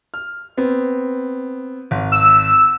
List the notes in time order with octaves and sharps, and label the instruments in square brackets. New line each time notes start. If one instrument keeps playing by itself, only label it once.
[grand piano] F6
B3 C4
G#1
[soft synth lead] E6